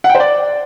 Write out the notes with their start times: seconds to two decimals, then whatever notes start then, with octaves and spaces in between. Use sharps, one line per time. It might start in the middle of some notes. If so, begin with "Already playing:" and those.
0.04 F#5
0.09 G5
0.15 C5
0.20 D5